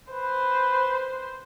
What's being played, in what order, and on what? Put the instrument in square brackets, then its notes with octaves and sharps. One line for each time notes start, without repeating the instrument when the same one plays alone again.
[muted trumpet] B4 [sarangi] C5